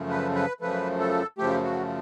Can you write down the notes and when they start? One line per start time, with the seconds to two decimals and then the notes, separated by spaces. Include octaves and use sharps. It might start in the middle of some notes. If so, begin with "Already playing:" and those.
Already playing: F#2 C#3 F3 A3
0.10 B4
0.35 B4
0.61 F#2 C#3 F3 A3 B4
1.00 A4
1.38 F#2 C#3 F3 A3 G4
1.64 F#4